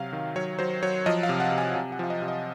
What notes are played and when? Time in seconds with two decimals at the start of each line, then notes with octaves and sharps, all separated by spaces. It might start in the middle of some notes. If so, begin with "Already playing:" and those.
Already playing: C3 F#3 F5
0.13 D#3
0.36 F#3 C#5
0.59 F#3 C5
0.83 F#3 C#5
1.06 F3 D#5
1.23 F5
1.29 C3
1.40 F#5
1.52 C3
1.58 G#5
1.75 C3 G#5
1.92 F#5
1.99 F3 F5
2.10 D#5
2.22 C3
2.28 D#5